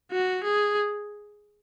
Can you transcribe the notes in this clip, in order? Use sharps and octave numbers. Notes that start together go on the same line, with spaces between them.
F#4
G#4